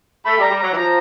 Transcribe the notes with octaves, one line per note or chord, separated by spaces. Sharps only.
A3 B5
G3
A#5
G3
F#3 A#5
E3
F3 A#5